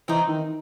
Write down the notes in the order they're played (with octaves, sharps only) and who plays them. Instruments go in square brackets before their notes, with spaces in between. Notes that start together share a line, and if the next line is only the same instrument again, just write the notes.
[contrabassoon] E3 [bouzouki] C4 D#4
[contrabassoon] D#3